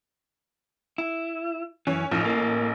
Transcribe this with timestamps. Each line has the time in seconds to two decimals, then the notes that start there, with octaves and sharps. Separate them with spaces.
0.98 E4
1.87 F#2 E3 C#4
2.11 A1 F3 D#4
2.25 A#3